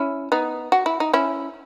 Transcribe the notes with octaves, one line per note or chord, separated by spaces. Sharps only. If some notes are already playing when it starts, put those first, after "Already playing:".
Already playing: C#4 E4
B3 D#4
F#4
E4
D#4
C#4 E4